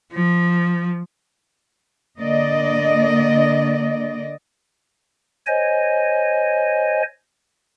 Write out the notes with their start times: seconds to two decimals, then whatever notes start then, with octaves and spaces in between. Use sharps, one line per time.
0.13 F3
2.19 D3 A#3 D5 D#5
5.47 C5 C#5 D#5 G#5